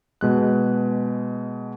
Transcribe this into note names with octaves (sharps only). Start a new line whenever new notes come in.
B2 G#3 F#6